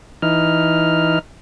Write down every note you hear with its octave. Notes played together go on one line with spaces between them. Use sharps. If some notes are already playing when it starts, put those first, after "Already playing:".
E3 D#4 F6